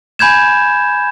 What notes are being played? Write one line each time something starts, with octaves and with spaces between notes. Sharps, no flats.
G#5 B5 G6 G#6 E7